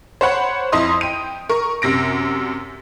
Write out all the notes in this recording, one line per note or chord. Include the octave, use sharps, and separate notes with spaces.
C5 C#5 F#5 B5
F2 E4 D#5 C6 D#6
G5 D#7
A#4 C#6
F#2 C3 A#6 D7